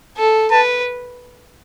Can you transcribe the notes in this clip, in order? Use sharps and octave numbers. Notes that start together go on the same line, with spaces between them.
A4
B4 A5